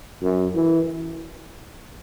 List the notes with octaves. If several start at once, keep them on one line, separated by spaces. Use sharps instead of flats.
F#2
E3